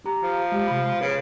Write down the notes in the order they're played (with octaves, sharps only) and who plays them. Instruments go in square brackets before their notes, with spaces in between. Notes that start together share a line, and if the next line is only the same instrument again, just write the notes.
[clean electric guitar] G4 A#5
[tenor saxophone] F3
[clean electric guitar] G#3 G4
C3 B5
[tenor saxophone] C#3 [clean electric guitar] B4